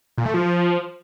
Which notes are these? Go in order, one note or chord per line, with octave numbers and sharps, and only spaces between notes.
A#2
A3
F3